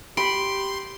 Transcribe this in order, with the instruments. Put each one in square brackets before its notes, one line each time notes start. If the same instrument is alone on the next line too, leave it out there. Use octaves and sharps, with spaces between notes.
[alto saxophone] G4 [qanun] B5 [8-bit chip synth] C6 [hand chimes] D7